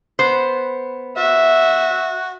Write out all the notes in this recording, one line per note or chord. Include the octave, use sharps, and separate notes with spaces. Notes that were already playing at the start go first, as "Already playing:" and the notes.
B3 C5
F#4 E5